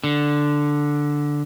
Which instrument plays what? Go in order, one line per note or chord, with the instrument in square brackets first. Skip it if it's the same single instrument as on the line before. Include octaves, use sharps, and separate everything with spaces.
[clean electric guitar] D3